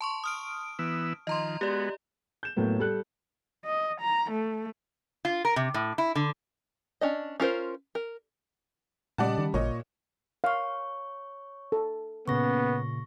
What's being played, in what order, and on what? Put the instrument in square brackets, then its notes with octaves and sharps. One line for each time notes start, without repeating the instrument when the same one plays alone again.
[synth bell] A5 C6 C#6
D#6 F6 D7
[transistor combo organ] E3 B3 E6
[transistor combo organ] D#3 F3 [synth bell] D#5 A#5 C6
[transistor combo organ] G#3 B3 F#4 [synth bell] G4 D5
[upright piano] G6 E7
A2 F#3 A#3 B3
G3 A4 F#6
[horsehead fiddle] D#5
A#5
A3
[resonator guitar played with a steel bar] F4
A#4
C3
A2
E4
D3
[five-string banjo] C#4 D4 D#5
C#4 F4 A#4 C5
A#4
[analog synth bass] A#2 [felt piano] C#3 G3 D#5 [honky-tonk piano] D5 F#5 A5
[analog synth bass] D#3
[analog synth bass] A1 [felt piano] A#2 [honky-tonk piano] C#5 D#5
[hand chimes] C#5 C#6 [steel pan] F5
[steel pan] A4
[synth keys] A#2 C#3 [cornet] B3 [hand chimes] C#6 A#6